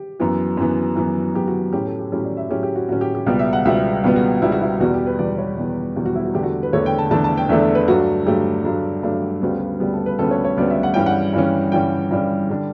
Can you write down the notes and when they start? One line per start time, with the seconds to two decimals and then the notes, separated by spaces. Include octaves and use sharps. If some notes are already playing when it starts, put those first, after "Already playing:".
Already playing: G4
0.20 F#2 E3 B3
0.57 F#2 E3 B3
0.96 F#2 E3 B3
1.34 F#2 E3 B3 G4
1.48 F#4
1.73 A2 F#3 C#4 G4
1.87 A4
1.99 G4
2.12 A2 F#3 C#4 G4
2.24 D5
2.37 E5
2.49 A2 F#3 C#4 G4
2.63 G4
2.76 F#4
2.89 A2 F#3 C#4 F#4
3.01 G4
3.15 G4
3.26 C#2 B2 G3 B3 D5
3.39 E5
3.53 F#5
3.65 C#2 B2 G3 B3 E5
4.04 C#2 B2 G3 B3
4.16 F#4
4.42 C#2 B2 G3 B3 E4
4.52 F#4
4.61 E4
4.80 E2 B2 G3 F#4
4.94 G4
5.06 B4
5.19 E2 B2 G3 D5
5.38 C#5
5.57 E2 B2 G3
5.96 E2 B2 G3 G4
6.06 F#4
6.15 E4
6.25 F#4
6.34 E2 D3 A3 D4 G4
6.43 F#4
6.63 B4
6.73 E2 D3 A3 D4 C#5
6.86 G5
6.98 A5
7.11 E2 D3 A3 D4 A5
7.24 A5
7.37 G5
7.49 E2 D3 A3 D4 E5
7.75 B4
7.88 G2 F#3 A3 D4 F#4
8.26 G2 F#3 A3 D4 G4
8.65 G2 F#3 A3 D4
9.03 G2 F#3 A3 D4
9.42 D2 C#3 G3 B3 F#4
9.80 D2 C#3 G3 B3 G4
9.94 A4
10.06 B4
10.19 D2 C#3 G3 B3 A4
10.31 C#5
10.44 C#5
10.57 D2 C#3 G3 B3 D5
10.70 E5
10.83 F#5
10.94 G2 E3 G3 C#4 G5
11.06 F#5
11.33 G2 E3 G3 C#4
11.72 G2 E3 G3 C#4 G5
12.11 G2 E3 G3 C#4
12.50 D3 G3 D4